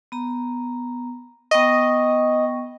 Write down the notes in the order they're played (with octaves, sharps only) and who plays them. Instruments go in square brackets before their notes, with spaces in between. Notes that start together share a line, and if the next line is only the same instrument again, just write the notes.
[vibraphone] B3 A#5
[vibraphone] B3 G5 C#6 [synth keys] D#5